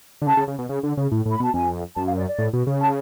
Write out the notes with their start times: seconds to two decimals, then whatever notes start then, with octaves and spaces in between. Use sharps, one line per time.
0.22 D3
0.27 C#3 A5
0.37 C#3
0.48 C#3
0.59 B2
0.69 C#3
0.83 D3
0.97 C#3
1.12 A2
1.26 A2
1.32 B5
1.40 B2 A5
1.54 F2 G#5
1.96 F#2 A5
2.07 F5
2.17 D5
2.28 D5
2.38 A2
2.53 B2
2.67 C#3
2.81 A5